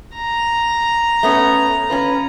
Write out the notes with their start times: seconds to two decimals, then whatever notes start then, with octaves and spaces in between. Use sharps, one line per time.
0.15 A#5
1.23 A3 B3 C#4
1.90 C#4 F4 B4